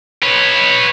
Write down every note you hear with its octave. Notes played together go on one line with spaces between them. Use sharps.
B4 C#5